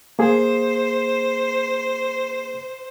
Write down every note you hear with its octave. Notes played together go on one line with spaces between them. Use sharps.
A#3 G#4 C5